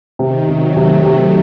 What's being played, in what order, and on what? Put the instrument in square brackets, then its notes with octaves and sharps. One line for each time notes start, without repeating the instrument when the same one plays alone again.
[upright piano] C3 [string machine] D#3
[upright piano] C3 [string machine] F#3
[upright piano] C3 [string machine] A3
[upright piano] C3